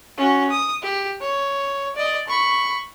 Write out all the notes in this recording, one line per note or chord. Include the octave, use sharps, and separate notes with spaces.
C#4 F#4
D#6
G4
C#5
D5 D#5
B5 C#6